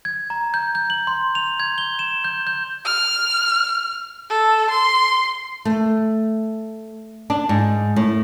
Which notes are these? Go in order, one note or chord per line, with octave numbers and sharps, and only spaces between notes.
G#6
A#5
G6
G6
F#7
C6
F7
G#6
G7
E7
G6
G6
F6
A4
C6
A3
D4
G#2
A2